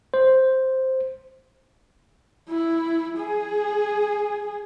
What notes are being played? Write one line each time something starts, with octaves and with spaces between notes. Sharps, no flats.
C5
E4
G#4